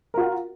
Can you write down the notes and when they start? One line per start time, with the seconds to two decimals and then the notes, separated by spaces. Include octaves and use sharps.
0.14 A#4
0.17 F4
0.21 F#4